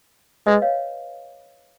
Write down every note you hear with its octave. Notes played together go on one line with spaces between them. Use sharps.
G#3 B4 D#5
C#5 F5